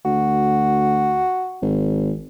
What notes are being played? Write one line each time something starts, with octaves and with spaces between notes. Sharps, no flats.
D2 F#4
G#1